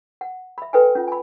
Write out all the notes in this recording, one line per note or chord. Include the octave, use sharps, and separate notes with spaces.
F#5
E5 B5
A4 B4 C5 E5 G5 G#5
C#4 F4
G#5 B5